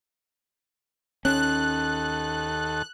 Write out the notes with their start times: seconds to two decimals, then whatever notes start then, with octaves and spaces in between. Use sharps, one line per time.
1.25 D#2 C#4 A4 F#6